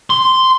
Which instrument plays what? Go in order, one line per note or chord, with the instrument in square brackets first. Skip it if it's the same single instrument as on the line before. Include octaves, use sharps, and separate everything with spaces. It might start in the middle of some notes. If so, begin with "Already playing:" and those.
[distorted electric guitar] C6